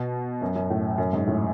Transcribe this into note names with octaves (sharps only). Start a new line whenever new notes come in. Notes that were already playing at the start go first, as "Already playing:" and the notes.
Already playing: B2
F#2
F#2
A2
F#2
G#2
A2